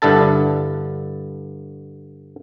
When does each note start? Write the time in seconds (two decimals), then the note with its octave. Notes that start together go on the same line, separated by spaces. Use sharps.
0.02 G2 D3 E4 A4 A5